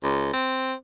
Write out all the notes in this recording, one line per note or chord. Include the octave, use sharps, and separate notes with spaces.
C#2
C4